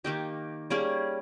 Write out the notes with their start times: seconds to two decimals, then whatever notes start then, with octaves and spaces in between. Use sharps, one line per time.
0.04 D#3 A#3 D#4 G4
0.70 G3 A#3 C#4 G#4